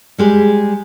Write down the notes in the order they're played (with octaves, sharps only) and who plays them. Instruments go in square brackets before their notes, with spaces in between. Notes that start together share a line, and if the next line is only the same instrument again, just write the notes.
[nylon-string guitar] G3 G#3 G4